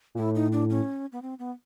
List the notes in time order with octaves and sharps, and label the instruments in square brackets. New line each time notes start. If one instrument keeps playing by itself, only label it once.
[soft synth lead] A#2
[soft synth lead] A2 [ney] E4
[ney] D#4
D4
C#4
B3
C4
B3